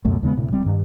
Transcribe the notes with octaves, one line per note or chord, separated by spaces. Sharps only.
C#2 F#2 B2 A3
D#2 C#3 G#3 B3
D2 A2 C3
D1 G3 C4
G2 D#3